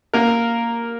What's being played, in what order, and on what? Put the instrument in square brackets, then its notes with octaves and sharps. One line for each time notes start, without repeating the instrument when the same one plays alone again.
[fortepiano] A#3 A#4